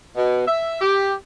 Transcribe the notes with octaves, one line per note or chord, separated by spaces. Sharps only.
B2
E5
G4